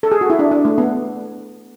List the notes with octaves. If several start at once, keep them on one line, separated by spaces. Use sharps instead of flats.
A4
G#4
F#4
E4
D4
D4
A3
B3